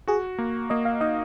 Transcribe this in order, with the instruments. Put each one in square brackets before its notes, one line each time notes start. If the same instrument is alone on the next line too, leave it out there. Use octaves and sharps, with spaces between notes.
[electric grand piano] F#4 [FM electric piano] G#4
[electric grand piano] A#3
[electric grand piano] A#3 [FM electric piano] D#5
[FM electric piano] F5
[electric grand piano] D#4 [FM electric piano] D#5